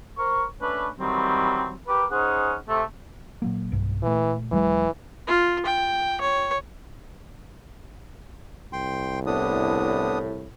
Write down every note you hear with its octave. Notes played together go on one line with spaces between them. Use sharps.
A#4 C5 C#6
A3 C#4 D4 B4
D#3 E3 F#3 G3 C4
G4 A#4 B4 D6
C#4 D#4 G#4 C5 F#5
C3 A3
A#2 F#3 A#3
B1 G2
A#2 E3 A3
D#1 E3 F#3 G#3
F4
G5
C#5
C2 G5 C6
A2 B3 D4 D#6